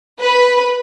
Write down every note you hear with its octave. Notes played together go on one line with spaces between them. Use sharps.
B4